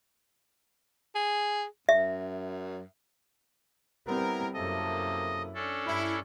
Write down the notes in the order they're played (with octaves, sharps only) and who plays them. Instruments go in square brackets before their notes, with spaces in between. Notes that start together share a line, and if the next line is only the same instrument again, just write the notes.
[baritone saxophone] G#4
[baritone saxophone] F#2 [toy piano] E5
[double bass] G3 C4 [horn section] B3 E4 A#4
[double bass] F#2 E4 [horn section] C3 A#3 A4 [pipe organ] D#5
[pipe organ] C#4 D4 A4
[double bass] G2 [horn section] E4